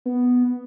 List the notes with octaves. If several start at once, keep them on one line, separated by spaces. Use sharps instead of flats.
B3